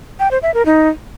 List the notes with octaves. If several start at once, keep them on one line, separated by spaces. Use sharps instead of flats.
G5
C5
E5
A#4
D#4